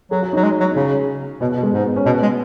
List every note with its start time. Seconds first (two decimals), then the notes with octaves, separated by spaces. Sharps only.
0.11 F#3 G#4
0.22 F#4
0.33 F#3 D#4
0.44 G#3
0.60 F#3
0.71 D#4
0.76 C#3 C#4
1.41 B2 B3
1.52 B3
1.57 B2
1.63 G#3
1.73 G#2 B3
1.84 B3
1.96 C#4
2.06 B2 B3
2.22 G#3